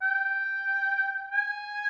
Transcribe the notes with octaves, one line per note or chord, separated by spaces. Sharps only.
G5
G#5